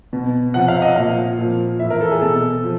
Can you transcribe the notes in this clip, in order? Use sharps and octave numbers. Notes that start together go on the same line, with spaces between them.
B2
C3 F3 F#5
F5
D#5
A#2 F3 F5
A#2 F3
A2 E3 E5
A#4
A4
G#4
B2 A4
F3